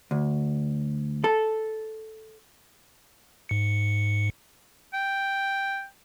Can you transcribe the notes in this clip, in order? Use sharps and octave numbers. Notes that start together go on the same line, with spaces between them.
D2
A4
G#2 C#7
G5